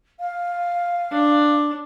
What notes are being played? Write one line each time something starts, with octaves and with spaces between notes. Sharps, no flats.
F5
D4